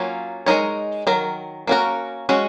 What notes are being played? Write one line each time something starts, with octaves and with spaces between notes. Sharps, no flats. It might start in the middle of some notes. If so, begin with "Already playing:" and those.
Already playing: F#3 A#3 C#4 F4
G#3 D#4 A#4 C#5
D#3 F#3 A#4
A#3 C#4 F#4 A#4
G#3 C#4 F#4